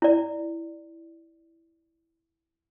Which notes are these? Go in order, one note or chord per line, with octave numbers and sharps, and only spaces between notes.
E4 D5